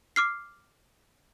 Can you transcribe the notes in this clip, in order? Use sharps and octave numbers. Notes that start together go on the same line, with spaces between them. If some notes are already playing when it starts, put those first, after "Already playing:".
D6 F6 C7